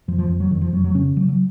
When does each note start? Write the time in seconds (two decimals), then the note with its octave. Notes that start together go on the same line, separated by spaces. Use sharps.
0.08 F2 F3
0.18 F3
0.29 F2 F3
0.40 F#3
0.51 F2 D#3
0.61 F3
0.73 F2 F#3
0.84 F#3
0.95 C#3 C#4
1.16 C#3 F#3
1.29 F#3